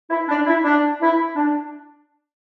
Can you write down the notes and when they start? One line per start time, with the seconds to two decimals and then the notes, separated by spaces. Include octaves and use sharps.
0.10 E4
0.29 D4
0.46 E4
0.64 D4
1.01 E4
1.36 D4